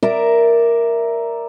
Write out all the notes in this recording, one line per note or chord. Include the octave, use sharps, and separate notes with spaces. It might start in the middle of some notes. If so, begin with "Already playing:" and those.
A#4 D5 E5 A#5